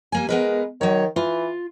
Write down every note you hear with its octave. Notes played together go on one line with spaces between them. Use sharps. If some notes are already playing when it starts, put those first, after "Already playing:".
G3 A#3 G#5
G#3 B3 A#4 B4
D#3 F#3 C#5
E3 F4